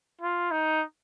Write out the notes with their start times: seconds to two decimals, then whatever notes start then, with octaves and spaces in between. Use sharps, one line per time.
0.21 F4
0.51 D#4